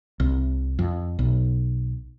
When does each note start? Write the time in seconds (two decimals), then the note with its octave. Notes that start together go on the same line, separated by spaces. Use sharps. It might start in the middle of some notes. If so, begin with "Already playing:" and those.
0.20 C2
0.79 F2
1.19 B1